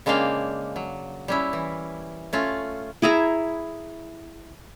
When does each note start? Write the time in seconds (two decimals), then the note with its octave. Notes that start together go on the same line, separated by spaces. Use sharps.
0.06 C#3 G#3 A#3 D4 F5 G5
0.76 F#3
1.28 G3 C#4 E4
1.53 E3
2.33 A3 C#4 F4
3.02 E4 G#4 E5 A#5